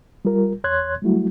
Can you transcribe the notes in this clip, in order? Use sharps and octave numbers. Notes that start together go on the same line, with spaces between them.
G3 F4 A#4
E2 C#5 C6 F#6 G#6
F#3 G3 A3 E4 F#4